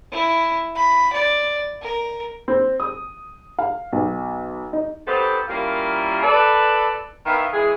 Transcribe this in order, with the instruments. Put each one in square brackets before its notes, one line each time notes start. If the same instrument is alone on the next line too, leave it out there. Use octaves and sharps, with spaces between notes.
[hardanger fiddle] E4
B5
D5
A#4
[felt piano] C4
D#6
F5
B1
D#4
[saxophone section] B3 C4 D#4 G4 A4 C5
G3 A#3 C#4 E4 F4 A#4
A4 B4 D5
D#3 B3 E4 E5 F5
E3 G#3 E4 G#4